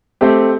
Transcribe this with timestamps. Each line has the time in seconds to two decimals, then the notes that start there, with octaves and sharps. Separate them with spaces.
0.21 A3 C4 G4